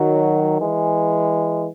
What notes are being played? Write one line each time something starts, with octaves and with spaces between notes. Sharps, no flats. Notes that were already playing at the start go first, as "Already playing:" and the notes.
Already playing: D#3 F#3
E3 G#3